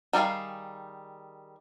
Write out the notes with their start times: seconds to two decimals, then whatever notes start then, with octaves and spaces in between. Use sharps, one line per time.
0.13 D#3 G3 A#3 G#4 F5